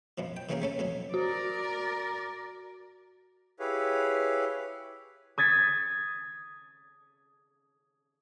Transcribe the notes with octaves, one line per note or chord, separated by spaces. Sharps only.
F#2 B2 F3
G5
D3 E3 A#3 C#4 G#4 A#4
A3 C#4 A4
F2 B2 F#3
F#4 A#4 D5
E4 G4 G#4 B4 C#5 F5
D#6 G#6 A6 B6 C#7